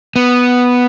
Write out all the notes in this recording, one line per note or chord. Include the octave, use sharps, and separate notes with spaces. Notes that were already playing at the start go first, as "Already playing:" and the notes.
B3